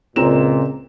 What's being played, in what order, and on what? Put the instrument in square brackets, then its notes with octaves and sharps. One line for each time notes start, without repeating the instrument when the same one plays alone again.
[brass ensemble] C#2 A#2 [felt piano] C4 A#5 E7